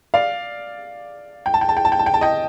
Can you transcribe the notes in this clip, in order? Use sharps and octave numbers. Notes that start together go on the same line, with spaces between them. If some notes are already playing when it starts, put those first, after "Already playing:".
D5 F5
G5
A5
G5
A5
G5
A5
G5
A5
G5
A5
D#5 G5